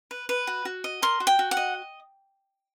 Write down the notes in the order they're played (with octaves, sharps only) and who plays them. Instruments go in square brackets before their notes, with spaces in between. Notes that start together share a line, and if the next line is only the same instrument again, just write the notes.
[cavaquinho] B4
B4
F#4
F#4
D#5
A#4 C6
F#4
G5
F#4
F#5
D#5